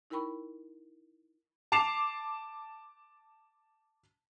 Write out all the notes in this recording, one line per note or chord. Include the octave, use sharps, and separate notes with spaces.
D#4 E4 A#4 G5 B5 C#6
A5 D6 C7 E7 F7